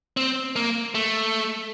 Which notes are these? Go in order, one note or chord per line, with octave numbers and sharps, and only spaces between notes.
C4
A#3
A3